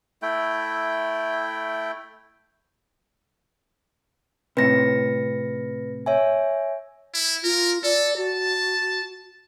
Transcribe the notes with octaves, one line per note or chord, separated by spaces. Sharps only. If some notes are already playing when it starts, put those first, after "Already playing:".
A3 E4 G5
A2 C3 B4 A#6 C#7
C#5 E5 G#5
E4
F4 A#4
A4 D5
F#4 A5